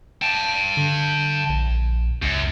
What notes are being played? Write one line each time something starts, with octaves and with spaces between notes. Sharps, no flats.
G5 A5
D3
A#1
C#2 F#2